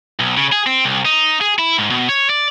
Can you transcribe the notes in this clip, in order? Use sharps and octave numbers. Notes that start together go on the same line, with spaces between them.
B1
C#3
G#4
C4
C2
D#4
G#4
E4
G#2
B2
C#5
D5